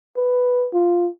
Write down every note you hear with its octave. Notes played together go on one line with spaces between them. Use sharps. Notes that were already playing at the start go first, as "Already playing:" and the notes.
B4
F4